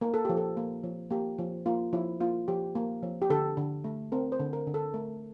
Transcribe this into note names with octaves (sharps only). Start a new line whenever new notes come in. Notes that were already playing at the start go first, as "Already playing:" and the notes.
A#3 A#4
A4
F3 G4
A4
A#3
F3
A#3 G4
F3
A#3 F4
F3 E4
A#3 F4
F3 G4
A#3
F3
G4
D3 A4
D3
A3
C4 A#4
C5
D3
A#4
D3
A4
A3 A#4